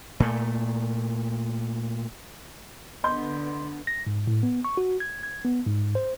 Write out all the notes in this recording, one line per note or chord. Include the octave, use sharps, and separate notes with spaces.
A#2 A3
D3 B3 D#5 C6 G6
A#6
G#2
A2
B3
C#6
F#4
G#6
G#6
B3
G#2
C5